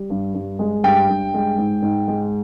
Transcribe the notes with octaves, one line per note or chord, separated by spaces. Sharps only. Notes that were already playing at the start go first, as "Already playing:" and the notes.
Already playing: G3
G2
G2
G#3
G2 G5
G2
G#3
G#2
G#2
G#3